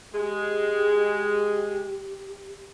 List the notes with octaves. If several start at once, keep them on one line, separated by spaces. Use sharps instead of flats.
G#3 G4